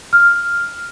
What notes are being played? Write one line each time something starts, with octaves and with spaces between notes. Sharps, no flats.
F6